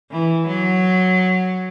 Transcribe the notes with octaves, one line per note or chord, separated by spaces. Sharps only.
E3
F#3